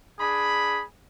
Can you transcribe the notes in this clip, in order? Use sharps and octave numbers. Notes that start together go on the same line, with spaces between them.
D4 G#4 B5